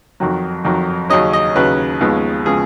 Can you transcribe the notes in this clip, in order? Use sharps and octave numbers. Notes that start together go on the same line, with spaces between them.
F2 D#3 F#3
F2 D#3 F#3
D#2 C#3 F#3 C#4 D#5
D#5
D#2 C#3 F#3 C#4 B4
D#2 C#3 F3 G#3 B3
C#3 F3 G#3 B3 G#4